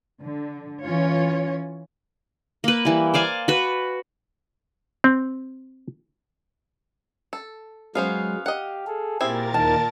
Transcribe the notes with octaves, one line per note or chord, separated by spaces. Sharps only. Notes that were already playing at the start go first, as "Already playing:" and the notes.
D3
E3 C#4 F4 C#5
A#3 B4
E3 G3
C5 D5 F5 G#5
F#4 B4
C4
A4
F#3 G#3 B3 C#4 C5 F5
G4 D#5 F#5
G#4 A4
A#2 C4 E4 G4 G#4 A#4 A6
D#2 D#4 A5